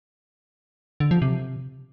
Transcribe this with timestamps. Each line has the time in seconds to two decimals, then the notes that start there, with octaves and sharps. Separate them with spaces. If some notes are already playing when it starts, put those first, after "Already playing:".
1.00 D3
1.11 F3
1.22 C3